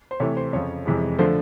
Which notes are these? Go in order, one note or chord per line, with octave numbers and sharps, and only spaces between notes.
C5
C3 E3 A3 C#5
C5
F2 C#3 F3 C#5
F2 C3 E3 G#3
D3 F3 A3 C5